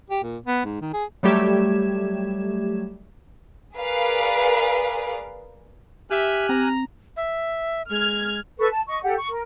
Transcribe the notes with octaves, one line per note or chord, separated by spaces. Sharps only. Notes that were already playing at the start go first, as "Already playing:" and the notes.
G4
A#2
B3
G#2
D#3
G#4
F#3 G3 A3 G4 G#6 E7
G#4 A#4 B4 D5 F5
G4 E5 G#5 F6 F#6
C4 A#5
E5
G#3 F6 G#6
A4 B4 C#6
A5
D#5 C#6
G4 A4 F#5
C#6
A#4